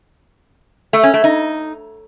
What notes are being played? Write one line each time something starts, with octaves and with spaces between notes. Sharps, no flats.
A3
C#4
A3
D#4